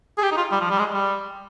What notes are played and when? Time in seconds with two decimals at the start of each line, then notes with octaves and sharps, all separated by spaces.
0.18 G#4
0.23 G4
0.32 D#4
0.37 F4
0.52 G3
0.61 F3
0.70 G3
0.79 G#3
0.93 G3